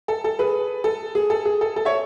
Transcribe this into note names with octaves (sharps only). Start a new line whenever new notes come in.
A4
A4
G#4 B4
A4
G#4
A4
G#4
A4
A4
C#5 E5